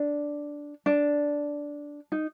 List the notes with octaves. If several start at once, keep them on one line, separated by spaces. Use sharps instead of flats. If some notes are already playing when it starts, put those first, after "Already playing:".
Already playing: D4
D4
D#4